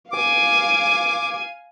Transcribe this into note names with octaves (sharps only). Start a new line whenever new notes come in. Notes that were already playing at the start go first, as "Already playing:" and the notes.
F5 G#5 D6